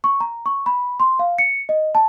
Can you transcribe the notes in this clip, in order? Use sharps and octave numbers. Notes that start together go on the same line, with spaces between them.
C#6
A#5
C#6
B5
C6
F5
C#7
D#5
A5